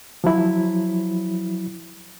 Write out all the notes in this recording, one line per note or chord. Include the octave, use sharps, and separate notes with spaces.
F3 F#3 E4